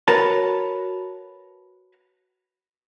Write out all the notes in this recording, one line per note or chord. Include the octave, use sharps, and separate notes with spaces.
F#4 A#4 B4 C#5 A5